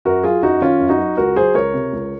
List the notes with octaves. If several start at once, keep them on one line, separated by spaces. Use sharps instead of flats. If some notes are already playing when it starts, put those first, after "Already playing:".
F#2 F#4 A#4
F#3 F4 G#4
F#2 D#4 F#4
D#3 C#4 F4
F#2
D#4 F#4
F#3
C#2 F#4 A#4
F#3 G#4 C5
C#2 A#4 C#5
C3
C#2